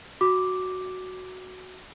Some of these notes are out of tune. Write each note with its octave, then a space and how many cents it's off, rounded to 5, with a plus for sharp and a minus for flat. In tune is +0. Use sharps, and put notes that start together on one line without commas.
F#4 +0 D6 +0